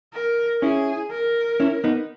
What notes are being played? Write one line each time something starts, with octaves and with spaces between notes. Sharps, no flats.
A#4
C#4 E4 G#4
A#4
C#4 E4
B3 D#4